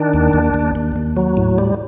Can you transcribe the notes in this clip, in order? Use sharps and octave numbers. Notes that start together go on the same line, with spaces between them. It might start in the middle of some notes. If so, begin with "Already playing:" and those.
Already playing: D#3 D4
D#2
D#2
D#2
D#2
D#2
F#3
A2
G3